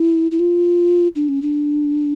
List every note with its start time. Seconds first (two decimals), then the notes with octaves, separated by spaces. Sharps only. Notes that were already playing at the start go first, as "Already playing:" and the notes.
Already playing: E4
0.31 E4
0.39 F4
1.16 D4
1.29 C#4
1.42 D4